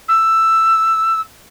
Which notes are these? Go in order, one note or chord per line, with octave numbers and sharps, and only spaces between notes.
E6